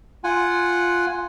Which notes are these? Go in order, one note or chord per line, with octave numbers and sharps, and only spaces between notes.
F4 F#5 G#5